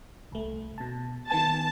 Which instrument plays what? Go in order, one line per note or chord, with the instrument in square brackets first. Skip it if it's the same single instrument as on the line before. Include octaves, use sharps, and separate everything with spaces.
[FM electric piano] C2 A3
B2 A5
[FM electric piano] D#3 B3 G#5 [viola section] A5